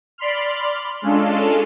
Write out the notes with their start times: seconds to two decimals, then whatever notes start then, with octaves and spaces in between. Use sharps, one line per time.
0.18 D5 B5 C6 F6
1.02 G#3 C#4 D4 F4 A4